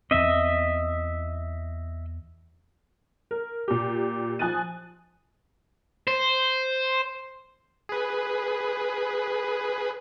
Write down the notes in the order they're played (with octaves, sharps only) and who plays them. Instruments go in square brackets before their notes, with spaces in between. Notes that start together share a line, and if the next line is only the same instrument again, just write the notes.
[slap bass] E2 C4 [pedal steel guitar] D#5 E5
[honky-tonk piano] A#4
A#2 G4
F3 G#5 D#6 F#6 A6 D#7
[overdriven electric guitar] C5
[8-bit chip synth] G#4 B4